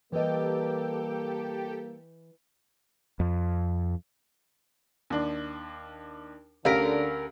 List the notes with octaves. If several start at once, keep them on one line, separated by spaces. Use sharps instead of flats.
E3 G3 A#3 G4 A4 D#5 G5
F2
D#2 D4
D2 D3 C#4 G4 A#4 F5 B6 D7